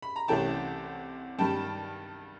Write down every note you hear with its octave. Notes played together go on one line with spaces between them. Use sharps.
B5
A#5
C2 C3 E3 A3 C#4 G5 A5
G2 D#3 G3 G5 A5